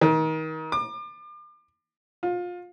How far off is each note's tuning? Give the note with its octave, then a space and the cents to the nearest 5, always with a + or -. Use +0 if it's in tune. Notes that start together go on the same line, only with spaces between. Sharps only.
D#3 +30
D6 +35
F4 +25